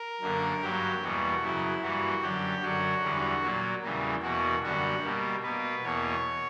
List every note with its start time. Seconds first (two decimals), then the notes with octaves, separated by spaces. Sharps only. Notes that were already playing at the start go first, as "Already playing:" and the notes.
Already playing: A#4
0.21 F#2 D3 A#3
0.62 G2 F#3 A#3 G4
1.02 E2 B2 G3 A#3 F#4
1.42 F#2 C#3 F#3 E4
1.82 G2 E3 G3 A#3 F#4
2.22 F#2 D3 F#3 G4
2.62 F#2 D3 F#3 F#4
3.02 E2 D3 G3
3.42 A#2 F#3 A#3
3.82 E2 C#3 E3 G3 A#3
4.22 E2 B2 A#3 F#4
4.63 F#2 D3 G3 F#4
5.04 B2 G3 A#3
5.43 B2 A#3 B4
5.83 E2 B2 A#3 C#5